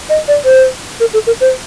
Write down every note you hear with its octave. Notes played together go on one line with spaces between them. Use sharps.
D#5
D5
C5
A#4
A4
A#4
C5